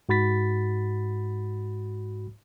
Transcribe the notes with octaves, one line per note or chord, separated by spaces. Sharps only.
G#2 F#4 B5 A6 B6